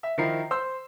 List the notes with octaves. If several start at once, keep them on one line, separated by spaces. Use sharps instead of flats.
E5
D#3 F3 E4 A#4 C7
C5 C6 E6